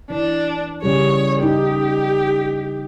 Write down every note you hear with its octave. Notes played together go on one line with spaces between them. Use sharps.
E3 D4
C#3 G3 G#4 C#5
D#4 G4